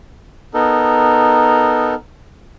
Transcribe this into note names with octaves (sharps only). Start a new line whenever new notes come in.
B3 D#4 A4 A#4